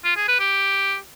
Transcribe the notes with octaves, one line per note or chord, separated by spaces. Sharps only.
F4
G#4
B4
G4